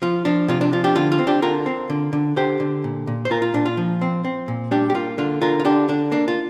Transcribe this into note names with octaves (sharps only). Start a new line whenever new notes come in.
F3 F4
F3 D4
C3 F4
D4
F3 F4
D4 G4
D3 F4
F4
C4
D4 G4
D3 F4 A#4
C4
D3
D3
D3 G4 C5
D3
A#2
A#2
C5
A#2 F4 A#4
F4
A#2 D4
F4
F3
C4
C4
A#2
G3 D4 G4
G4
A#3 F4
D3 F4
D3 F4 A#4
F4
D3 D4 G4
D3 D4
A#3 D4
F4